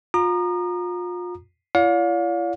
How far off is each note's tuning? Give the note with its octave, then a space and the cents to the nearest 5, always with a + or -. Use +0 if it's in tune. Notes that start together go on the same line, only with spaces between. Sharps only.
F4 +30 A#5 +5 D#6 -40
E4 +45 D5 -45 F5 +35